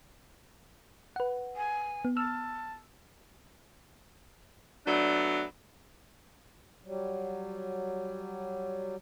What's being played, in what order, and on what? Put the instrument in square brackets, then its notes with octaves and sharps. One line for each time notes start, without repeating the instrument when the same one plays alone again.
[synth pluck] B4 F#5
[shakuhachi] G#5
[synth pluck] B3
[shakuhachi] A5 [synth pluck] E6 F6
[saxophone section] F#3 A3 B3 D4
[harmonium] F#3 G3